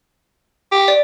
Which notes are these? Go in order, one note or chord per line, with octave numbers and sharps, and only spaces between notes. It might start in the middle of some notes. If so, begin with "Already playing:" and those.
G4
D5